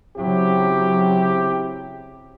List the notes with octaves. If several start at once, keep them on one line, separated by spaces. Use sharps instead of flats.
C#3 F#3 C4 E4 G4